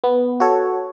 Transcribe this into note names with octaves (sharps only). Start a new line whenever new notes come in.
B3
F#4 A4 C#5